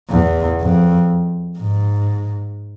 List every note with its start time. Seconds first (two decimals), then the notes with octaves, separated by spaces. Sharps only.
0.10 E2
0.60 F2
1.59 G#2